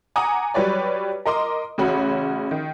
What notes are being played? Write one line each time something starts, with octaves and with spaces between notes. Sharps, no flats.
F#5 G#5 A#5 D6 D#6
F#3 G3 B4 C#5 D5
A#4 D#5 C6 D6
A1 C#3 C#4 F#4 C#5 B5
D#3